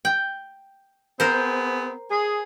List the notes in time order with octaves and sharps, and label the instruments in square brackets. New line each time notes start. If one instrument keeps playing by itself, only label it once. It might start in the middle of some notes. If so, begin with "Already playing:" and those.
[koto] G5
[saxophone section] B3 C4 G#4 [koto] A#4 C5
[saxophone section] G#4